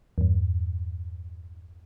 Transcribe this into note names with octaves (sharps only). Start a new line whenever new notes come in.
E2 G2